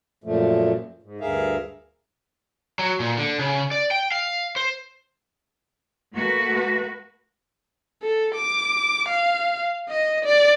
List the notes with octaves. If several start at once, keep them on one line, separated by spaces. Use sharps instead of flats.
F#2 A#2 F3 A3
G#2
D2 G2 G#4 A#4 E5 F5
F#3
A#2
D3
C#3
D5
G5
F5
C5
A3 A#3 F#4 B4
A4
D6
F5
D#5
D5